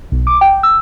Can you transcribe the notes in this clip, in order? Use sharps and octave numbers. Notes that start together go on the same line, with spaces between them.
B1
D6
G5
E6